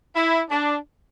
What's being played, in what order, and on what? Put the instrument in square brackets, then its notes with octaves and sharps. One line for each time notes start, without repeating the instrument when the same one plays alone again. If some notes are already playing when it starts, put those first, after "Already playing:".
[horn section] E4
D4